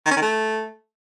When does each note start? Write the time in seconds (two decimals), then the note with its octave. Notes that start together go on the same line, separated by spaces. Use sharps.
0.06 D#3
0.11 C#4
0.16 D#3
0.22 A3